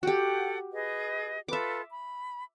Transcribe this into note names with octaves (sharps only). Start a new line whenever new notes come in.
F#4 G4 A4 F#5 G5
G#4 B4 D#5
F4 A4 B4 E5 D6
B5